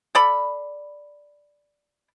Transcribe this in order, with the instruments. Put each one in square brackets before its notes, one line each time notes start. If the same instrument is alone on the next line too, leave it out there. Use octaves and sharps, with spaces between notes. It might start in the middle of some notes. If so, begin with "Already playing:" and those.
[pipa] A4 D5 B5